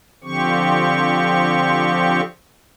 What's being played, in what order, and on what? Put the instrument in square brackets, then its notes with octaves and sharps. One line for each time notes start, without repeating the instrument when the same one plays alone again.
[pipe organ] D3 F3 C4 G4 C#6